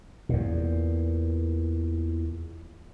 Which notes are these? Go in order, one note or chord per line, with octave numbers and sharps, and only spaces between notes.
E2 A#2